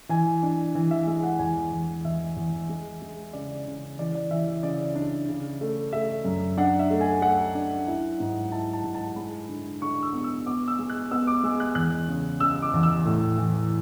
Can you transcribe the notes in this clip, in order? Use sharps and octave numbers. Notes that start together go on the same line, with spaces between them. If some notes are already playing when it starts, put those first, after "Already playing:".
E3 G#5
D4
E3
E5
G#3 E5
F#5
E2 G#5
E2
E2 E5
E2
G#3
G#3
C#3 D5
C#3
E3 D5
D5
E3 E5
E5
C#3 D5
D4
C#3
A3
A3 E5
F#2
D4 F#5
E5
A3
G#5
A3 F#5
D4
E4
G#2
E4 A5
A5
G#2
A5
G#3 B5
D3
D3 C#6
E6
B3
E6
B3 D6
E6
G#3
F#6
B3 E6
D6
G#3 E6
F#6
E2 F#6
C#3
C#3 E6
D6
E2
E6
A2
E3